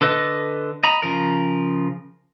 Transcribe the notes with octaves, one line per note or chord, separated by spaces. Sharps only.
D3 A4 B4 D#5
D#5 A#5 B5
C#3 F3 A#4